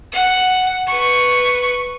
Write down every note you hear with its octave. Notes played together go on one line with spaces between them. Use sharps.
F#5
B4 C#6